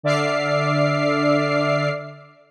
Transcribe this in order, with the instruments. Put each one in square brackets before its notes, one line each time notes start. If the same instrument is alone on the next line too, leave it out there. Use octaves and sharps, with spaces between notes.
[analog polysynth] D3 D5 E5 D6 F6 C7